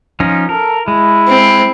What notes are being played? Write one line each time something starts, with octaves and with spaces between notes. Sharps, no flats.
F3 C#4 D#4
A4 A#4
G#3 E4
C4